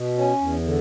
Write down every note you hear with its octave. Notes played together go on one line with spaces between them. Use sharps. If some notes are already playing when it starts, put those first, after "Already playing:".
Already playing: B2
C#4
E2
D3